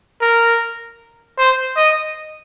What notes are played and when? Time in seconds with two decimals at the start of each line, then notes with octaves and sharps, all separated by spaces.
0.21 A#4
1.38 C5
1.76 D#5